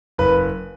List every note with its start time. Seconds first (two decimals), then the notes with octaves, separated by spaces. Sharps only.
0.18 F#1 B4